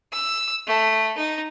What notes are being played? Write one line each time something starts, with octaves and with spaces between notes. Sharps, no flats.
E6
A3
D#4